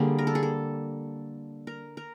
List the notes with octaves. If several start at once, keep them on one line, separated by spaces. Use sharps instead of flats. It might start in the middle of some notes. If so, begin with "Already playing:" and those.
Already playing: D3 G3 A#3 G#4
A#4
A4
G#4
A4
A#4
A#4